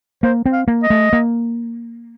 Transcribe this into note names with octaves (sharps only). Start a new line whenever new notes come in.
A#3 C5
C4
F5
A#3
D#5
A3
A#3